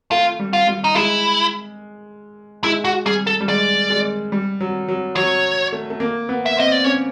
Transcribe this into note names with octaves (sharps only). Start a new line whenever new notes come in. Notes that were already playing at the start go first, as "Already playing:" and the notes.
A3 F4
G3
F4
G3
D#4
G#3 E4
G#3 E4
F#4
G3 G#4
A4
G3
G#3 D5
G#3
G3
F#3
F#3
F#3 C#5
A3
A3
A#3
B3
E5
C4 D#5
D5
C#4 C#5